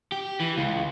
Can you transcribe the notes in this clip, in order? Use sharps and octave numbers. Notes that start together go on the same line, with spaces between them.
G4
E3
C#2